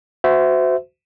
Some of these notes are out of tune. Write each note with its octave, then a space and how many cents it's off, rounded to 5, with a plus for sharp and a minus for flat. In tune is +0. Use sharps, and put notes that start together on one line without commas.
F#4 -5 C5 -30 E5 +0